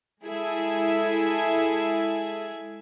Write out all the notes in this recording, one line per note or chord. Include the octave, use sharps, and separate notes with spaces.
G#3 E4 G#4 A4 E5 G#6